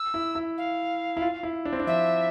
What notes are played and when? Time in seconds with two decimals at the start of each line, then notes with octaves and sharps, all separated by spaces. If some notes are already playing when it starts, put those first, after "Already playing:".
Already playing: E6
0.14 E4
0.35 E4
0.57 F5
1.17 E4
1.22 F4
1.43 E4
1.65 D4
1.73 C4
1.80 D4
1.87 F3 E5